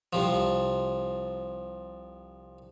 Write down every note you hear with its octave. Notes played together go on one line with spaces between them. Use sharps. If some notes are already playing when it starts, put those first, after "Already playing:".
C2 C3 F3